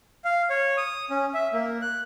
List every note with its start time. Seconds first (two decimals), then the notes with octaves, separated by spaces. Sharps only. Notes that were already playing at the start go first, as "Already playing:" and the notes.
0.25 F5
0.50 C#5
0.77 D#6
1.10 C#4
1.34 E5
1.53 A#3
1.82 F#6